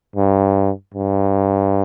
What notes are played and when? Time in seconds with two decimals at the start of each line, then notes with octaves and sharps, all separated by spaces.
0.16 G2
0.94 G2